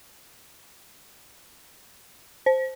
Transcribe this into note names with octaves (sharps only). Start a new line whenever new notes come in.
C5